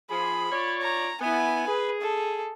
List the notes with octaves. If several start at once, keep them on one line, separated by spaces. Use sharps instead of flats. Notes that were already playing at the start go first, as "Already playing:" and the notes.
F3 G#4 B5
F4 C#5 D5
A#5
B3 E4 G#5
G#4 B4
A4